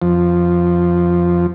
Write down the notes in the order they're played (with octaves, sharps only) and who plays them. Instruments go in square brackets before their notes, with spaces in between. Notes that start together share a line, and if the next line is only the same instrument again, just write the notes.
[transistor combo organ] F2 F3